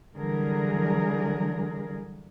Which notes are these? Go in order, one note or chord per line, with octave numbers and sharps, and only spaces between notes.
D3 E3 F#3 G3 G#4 A#4